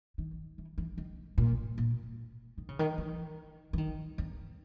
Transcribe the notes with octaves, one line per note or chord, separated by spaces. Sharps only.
D#3
E3
E3
D#3
A#2
A#2
D#3
C#3
D#3
E3
E3
D#3
E2